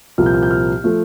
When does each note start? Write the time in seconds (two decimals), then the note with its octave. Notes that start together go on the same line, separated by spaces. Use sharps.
0.18 C2 A#2 F3 A#3 F6
0.26 G6
0.34 F6
0.43 G6
0.51 F6
0.84 F3 A3